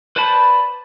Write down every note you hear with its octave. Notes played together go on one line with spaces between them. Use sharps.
B4 C5 D5 A5 B5